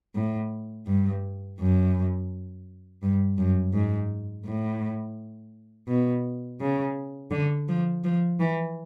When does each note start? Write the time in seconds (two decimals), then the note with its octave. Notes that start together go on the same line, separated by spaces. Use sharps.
0.15 A2
0.87 G2
1.60 F#2
3.02 G2
3.38 F#2
3.73 G#2
4.45 A2
5.88 B2
6.61 C#3
7.31 D3
7.68 F3
8.04 F3
8.40 E3